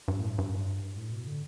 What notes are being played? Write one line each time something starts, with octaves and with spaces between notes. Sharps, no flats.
G2
A2
G2
A2
B2
D3